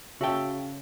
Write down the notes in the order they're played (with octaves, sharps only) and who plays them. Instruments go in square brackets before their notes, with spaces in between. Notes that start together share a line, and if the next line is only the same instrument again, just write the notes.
[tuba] C#3 [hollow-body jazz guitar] F#4 G5 [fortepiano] E5 A5 E6